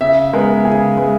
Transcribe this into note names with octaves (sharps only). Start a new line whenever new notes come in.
C#3 E5
G#3 B3 A#4
C#3 G#4
G#3 B3